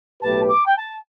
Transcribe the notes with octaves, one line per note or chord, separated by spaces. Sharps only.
B1 A2 A3 G4 B4 A5
D6
G5
A5